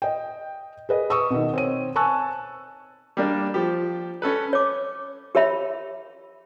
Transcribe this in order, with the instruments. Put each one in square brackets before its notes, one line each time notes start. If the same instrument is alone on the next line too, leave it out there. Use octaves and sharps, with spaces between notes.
[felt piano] D#5 G5
G#4 B4 D#5
C#6 D#6 E6
B2 D#3
C4 C#5 D#7
G#5 A5 C#6 E6 F#6
[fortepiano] G3 A#3 D4
F3 G4
C#4 A4 B4
[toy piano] C#5 D6
G4 A#4 C#5 E5 B5